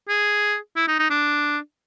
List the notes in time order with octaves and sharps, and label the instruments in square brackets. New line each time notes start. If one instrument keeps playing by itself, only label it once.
[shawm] G#4
E4
D#4
D#4
D4